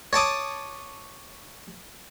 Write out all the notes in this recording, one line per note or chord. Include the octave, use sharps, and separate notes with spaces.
C#5 A5 D6 D#6